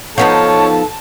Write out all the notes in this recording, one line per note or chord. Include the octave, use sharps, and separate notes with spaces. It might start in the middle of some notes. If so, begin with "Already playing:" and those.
F3 B3 D#4 A4 C#5 A5